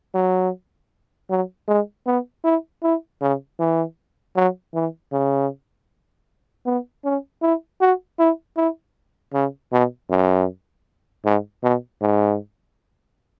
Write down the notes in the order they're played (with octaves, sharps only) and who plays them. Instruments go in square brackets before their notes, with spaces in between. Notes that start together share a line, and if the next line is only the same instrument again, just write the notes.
[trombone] F#3
F#3
G#3
B3
E4
E4
C#3
E3
F#3
E3
C#3
B3
C#4
E4
F#4
E4
E4
C#3
B2
F#2
G#2
B2
G#2